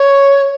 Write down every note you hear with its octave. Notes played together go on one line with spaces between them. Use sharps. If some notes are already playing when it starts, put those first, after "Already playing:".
Already playing: C#5